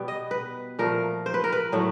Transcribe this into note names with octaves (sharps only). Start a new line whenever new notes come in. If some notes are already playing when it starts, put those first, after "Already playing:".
Already playing: B2 G3 B3
D#5
B4
A#2 F3 A3 A#4
C5
B4
A#4
B4
A2 F#3 A3